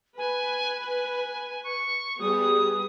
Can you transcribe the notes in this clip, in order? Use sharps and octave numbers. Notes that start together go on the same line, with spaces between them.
B4 G#5
G#5
C#6
G3 B3 G#4 D#6